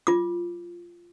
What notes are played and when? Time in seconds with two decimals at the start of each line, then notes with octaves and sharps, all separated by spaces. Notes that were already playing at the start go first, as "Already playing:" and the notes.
0.07 F4 D6